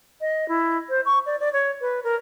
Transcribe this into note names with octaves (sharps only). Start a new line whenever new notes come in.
D#5
E4
C5
C#6
D5
D5
C#5
B4
A#4